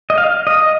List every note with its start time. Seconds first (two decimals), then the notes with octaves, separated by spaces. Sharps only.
0.10 D#5
0.18 F5
0.47 D#5